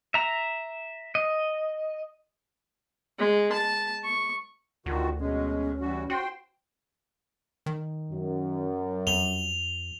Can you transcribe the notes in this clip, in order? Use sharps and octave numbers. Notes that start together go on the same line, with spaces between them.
E5 A#5
D#5
G#3
A5
C#6
D2 D3 D#3 F4 F#4
B2 G#3 C#4
E3 G3 F#4
F#4 C5 G5 C6
D#3
F#2
F2 F7 G7